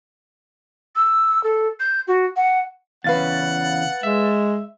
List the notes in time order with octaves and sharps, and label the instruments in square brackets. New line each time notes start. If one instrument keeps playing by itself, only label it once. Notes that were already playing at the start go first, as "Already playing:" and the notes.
[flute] E6
A4
G6
F#4
F#5
[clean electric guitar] E2 A#2 C#3 [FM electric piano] B4 F5 A6 [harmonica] F#5
[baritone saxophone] G#3 [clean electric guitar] E5